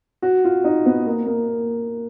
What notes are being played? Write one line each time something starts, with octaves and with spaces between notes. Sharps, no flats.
F#4
F4
D#4
B3
A#3
A#3